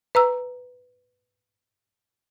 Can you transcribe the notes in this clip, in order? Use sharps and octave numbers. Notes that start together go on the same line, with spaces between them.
B4 A#5 E6